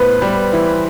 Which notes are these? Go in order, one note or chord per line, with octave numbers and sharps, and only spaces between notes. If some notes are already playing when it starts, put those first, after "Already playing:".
Already playing: A2 B3 B4 C5
G3
E3